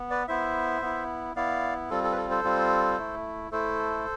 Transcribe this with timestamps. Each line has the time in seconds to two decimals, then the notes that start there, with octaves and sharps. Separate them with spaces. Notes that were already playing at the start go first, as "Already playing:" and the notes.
Already playing: B3
0.10 B4 D5
0.28 B3 E4 C5 E5
0.82 B3 E4
1.36 B3 E4 D5 F5
1.90 G3 C4 F4 A4
2.04 A4
2.12 B4
2.17 A4
2.30 A4 C5
2.44 G3 C4 F4
2.98 A3 E4
3.52 A3 E4 A4 C5